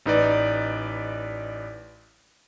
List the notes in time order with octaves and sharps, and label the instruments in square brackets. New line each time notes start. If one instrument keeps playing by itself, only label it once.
[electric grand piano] A1 D#4 B4 D5